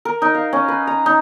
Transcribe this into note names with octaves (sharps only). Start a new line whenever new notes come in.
A#4
D#4
F5
C#4
B4
A#5
D#4